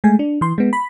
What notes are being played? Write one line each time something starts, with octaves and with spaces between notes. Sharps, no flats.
G#3 A3 G#5
D4
E3 C6
G#3 B3
B5